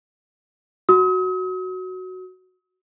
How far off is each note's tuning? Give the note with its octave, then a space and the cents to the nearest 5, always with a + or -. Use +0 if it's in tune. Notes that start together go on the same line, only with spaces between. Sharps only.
F#4 +0 D#6 +40